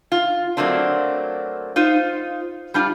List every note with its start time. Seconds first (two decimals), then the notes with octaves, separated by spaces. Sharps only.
0.12 F4
0.57 F#3 A3 A#3 C4 D4
1.76 D#4 F4 C5
2.74 G3 D4 F4